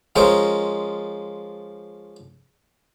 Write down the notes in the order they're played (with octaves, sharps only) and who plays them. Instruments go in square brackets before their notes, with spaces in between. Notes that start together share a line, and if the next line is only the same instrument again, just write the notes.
[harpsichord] F3 G#3 C#4 A#4 C5 D#5